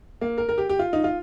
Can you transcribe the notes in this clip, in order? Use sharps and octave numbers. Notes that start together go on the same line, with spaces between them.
A#3
A#4
A#4
G4
G4
F4
D#4
F4